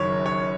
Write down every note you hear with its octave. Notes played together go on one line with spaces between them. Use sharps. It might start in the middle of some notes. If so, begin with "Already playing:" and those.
Already playing: F#1 F#2 D#3 C#5
C#5